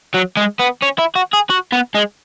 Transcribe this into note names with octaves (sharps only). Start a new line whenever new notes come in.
F#3
G#3
B3
C#4
E4
F#4
G#4
F#4
B3
G#3